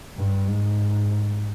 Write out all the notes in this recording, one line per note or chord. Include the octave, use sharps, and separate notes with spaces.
G2
G#2